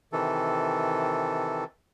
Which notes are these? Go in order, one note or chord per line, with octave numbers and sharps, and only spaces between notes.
C3 D#3 E3 A4